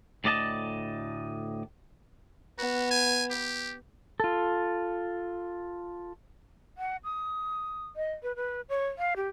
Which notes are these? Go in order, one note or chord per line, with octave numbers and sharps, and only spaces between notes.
D2 A2 D5 D#5 A5
B3 F#4
G#5
G4
F4 A4
F#5
D#6
D#5
B4
B4
C#5
F5
G4